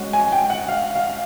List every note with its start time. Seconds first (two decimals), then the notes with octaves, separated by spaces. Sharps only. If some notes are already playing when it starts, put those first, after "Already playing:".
Already playing: G#3 C#4 F#4
0.13 G#5
0.32 G5
0.50 F#5
0.68 F5
0.96 F5